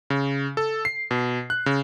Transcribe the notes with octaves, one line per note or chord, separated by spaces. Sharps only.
C#3
A4
C7
B2
F#6
C#3